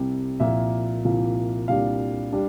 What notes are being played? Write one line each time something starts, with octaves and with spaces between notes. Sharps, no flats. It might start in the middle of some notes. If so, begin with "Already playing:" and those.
Already playing: C2 C3 G3
C2 A#2 F3 A#3 E5
C2 A#2 F3 A#3
C2 A#2 G3 D4 F5
G3 D4